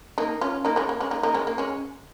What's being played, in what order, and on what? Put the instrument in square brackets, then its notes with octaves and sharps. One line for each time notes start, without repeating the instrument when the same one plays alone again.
[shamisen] A#3 D#4
C#4 F4
A#3 D#4
G#3 C#4
A#3
G#3 C#4
A#3 D#4
A#3 D#4
G#3 C#4
A#3
G#3 C#4